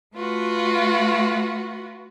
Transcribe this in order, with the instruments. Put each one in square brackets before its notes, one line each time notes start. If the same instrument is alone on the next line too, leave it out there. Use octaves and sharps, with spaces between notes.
[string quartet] A3 F4 F#4 B4